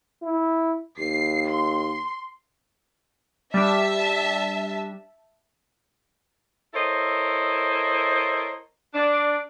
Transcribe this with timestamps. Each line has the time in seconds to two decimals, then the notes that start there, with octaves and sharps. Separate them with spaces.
0.22 E4
0.99 D#2 C7
1.49 C6
3.54 G3 D4 E5 A5
6.74 E4 A4 A#4 C5 C#5 D#5
8.94 D4